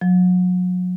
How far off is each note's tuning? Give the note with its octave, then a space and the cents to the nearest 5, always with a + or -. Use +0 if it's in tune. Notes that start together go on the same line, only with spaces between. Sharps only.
F#3 -35